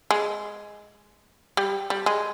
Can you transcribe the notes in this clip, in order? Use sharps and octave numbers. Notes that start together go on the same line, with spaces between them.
G#3
G3
G3
G#3